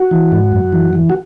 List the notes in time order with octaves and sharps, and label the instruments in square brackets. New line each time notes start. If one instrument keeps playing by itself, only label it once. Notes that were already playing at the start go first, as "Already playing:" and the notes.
Already playing: [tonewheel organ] F#4
E3
G#2
F#2
E3
E3
F#4